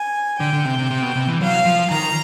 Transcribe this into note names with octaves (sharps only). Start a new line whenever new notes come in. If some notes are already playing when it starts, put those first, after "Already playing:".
Already playing: G#5
D3 G5
D3
C3
C3
C3
B2
C3
E3
F#3 F5
F3
D#3 A#5